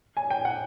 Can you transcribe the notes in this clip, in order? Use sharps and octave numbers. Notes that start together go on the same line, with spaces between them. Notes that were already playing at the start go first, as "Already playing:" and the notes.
G#5
G5
F#5